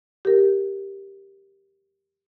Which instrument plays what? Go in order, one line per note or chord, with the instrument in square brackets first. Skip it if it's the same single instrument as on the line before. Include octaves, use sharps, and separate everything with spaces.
[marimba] G4 A#4